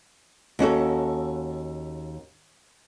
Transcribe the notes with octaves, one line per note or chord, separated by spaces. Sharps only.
D#2 C#4 F#4 A4